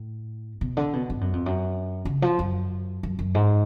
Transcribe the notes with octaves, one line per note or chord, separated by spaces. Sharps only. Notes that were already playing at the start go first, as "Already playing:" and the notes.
Already playing: A2
B2
D3
B2
G#2
F#2
F2
F#2
C#3
F3
F#2
F#2
F#2
G#2